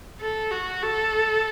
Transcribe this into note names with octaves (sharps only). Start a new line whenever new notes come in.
A4
F#4
A4